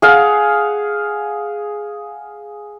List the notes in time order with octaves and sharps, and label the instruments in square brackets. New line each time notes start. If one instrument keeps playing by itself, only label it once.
[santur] G#4 F5 F#5